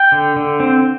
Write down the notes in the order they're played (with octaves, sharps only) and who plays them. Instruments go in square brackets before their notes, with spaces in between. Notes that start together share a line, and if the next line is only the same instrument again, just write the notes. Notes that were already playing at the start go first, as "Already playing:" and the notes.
Already playing: [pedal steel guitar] G5
D3
D3
C4